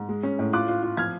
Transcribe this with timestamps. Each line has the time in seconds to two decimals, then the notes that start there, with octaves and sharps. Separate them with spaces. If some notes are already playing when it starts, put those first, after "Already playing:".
Already playing: G#2
0.09 G#3
0.23 C#4
0.39 A2
0.53 F4 D6 F#6
0.68 F4
0.83 F4
0.97 F3 F6 G#6